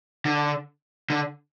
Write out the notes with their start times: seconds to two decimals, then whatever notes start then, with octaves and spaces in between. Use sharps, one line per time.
0.26 D3
1.10 D3